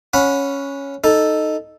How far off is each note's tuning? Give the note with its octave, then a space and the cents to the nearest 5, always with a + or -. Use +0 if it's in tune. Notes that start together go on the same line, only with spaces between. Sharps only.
C#4 +0 F#5 -25 B5 +0
D#4 -5 A4 +0